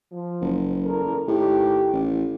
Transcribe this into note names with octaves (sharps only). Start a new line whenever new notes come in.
F3
F#1
E2 A4 A#4
A2 D#3 D#4 G4
A1